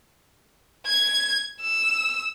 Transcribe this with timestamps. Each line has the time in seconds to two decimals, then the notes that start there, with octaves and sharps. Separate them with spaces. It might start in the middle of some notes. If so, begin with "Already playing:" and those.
0.87 G#6
1.61 E6